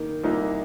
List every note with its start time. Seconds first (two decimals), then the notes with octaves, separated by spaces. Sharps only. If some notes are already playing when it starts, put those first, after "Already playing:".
Already playing: D#3 A#3
0.24 C2 A#2 A#3 D#4